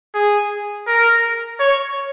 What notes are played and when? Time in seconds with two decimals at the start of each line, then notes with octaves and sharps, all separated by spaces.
0.15 G#4
0.87 A#4
1.59 C#5